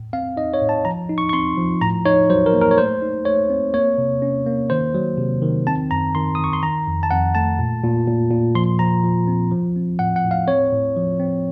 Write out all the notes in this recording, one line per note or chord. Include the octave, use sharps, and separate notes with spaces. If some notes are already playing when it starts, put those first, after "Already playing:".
Already playing: A2
C4 F5
D#4 D#5
C#5
A2
A5
F3 A#5
D#4
C#6
C#6
C4 C6
F3
A2 A#5
D#4 C#5
F#3 C5
A#4
A#3
A#4
C#5
A3 C5
D#4
A3 C#5
C4
A#3 C#5
C3
C#4
A#3
D#3 C5
F#3
C3
D#3
C4 A5
F#2 A#5
D#3 C6
D#3 D#6
C#6
C6
D#3 A#5
F2
A5
F2 F#5
A3 A5
A#2
A#2
A#2
A#2
F3 C6
F3 A#5
F3
C4
F3
C4
A2 F#5
F#5
A2
F5
C4 C#5
A2
F3
C4